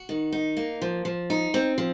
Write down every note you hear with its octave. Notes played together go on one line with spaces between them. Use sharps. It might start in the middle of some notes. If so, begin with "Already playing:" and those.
Already playing: F#4
D#3
D#4
A#3
F3
F3
D#4
C4
F3